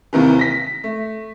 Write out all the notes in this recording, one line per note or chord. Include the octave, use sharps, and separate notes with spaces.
D#2 C3 D#3 E3
A#6 B6
A3